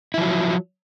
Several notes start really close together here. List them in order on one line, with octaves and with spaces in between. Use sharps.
E4 F3 F#3